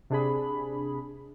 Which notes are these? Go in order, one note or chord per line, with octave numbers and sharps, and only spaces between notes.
C3 D4 G#4 B5